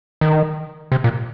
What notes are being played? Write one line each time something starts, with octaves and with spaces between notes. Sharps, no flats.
D#3
C3
A#2